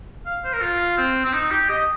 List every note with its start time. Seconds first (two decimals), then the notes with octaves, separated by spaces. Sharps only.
0.26 F5
0.44 C5
0.53 A#4
0.62 F4
0.98 C4
1.25 C4
1.34 D#4
1.51 G4
1.69 D#5